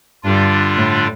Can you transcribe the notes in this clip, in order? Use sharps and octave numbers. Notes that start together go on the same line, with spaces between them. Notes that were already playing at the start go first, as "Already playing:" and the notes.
G2 D3 G3 D4 F4
A2